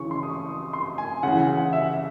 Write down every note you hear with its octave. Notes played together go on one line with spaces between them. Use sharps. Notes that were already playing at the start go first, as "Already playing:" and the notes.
Already playing: C#3 E3 C#6
C6
D#6
C#6
D#6
C6
G#5
C#3 E3 F#5
F#5
E5
E5